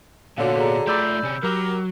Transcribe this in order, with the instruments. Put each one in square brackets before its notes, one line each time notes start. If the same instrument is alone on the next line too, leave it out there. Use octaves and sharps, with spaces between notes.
[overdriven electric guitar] A#2 B3 [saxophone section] D3 [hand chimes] F#4 C#5 F5
[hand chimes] G#4 A4 A#5
[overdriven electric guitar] A3 F4 [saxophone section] D5 [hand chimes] B5 E6 G6
[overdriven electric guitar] C3 C#4
[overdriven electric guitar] F#3 [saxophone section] G4 A#4